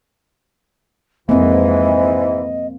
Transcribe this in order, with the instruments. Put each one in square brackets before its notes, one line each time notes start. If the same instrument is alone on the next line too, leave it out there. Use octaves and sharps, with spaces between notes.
[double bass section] F2 G#3 [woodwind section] G#2 E3 [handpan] A#3 C4 [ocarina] D#5